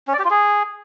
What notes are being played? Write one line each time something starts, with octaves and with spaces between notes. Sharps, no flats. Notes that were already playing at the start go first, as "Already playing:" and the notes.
C#4
D5
G4
F4
G#4